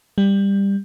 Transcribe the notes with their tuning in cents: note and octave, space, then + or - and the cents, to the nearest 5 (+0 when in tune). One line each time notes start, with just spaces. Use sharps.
G3 +15